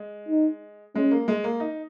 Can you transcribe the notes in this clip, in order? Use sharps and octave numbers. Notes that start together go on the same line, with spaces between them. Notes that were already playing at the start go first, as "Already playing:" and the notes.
Already playing: G#3
D#4
G#3 C#4
A#3
G#3
A#3
D#4